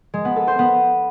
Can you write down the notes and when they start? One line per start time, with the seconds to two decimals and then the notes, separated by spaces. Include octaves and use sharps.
0.14 G#3
0.25 B3
0.36 A4
0.47 C5
0.59 B3